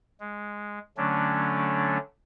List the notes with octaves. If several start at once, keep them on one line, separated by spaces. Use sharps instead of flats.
G#3
D3 F#3 A3 C#4 D4